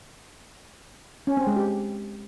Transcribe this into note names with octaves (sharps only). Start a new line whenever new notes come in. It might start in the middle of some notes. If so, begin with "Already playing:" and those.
C#4
C4
G#3
G4